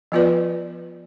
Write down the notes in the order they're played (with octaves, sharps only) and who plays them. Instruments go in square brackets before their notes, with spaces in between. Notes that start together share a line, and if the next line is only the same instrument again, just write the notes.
[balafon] F3 B3 F4 B4 D5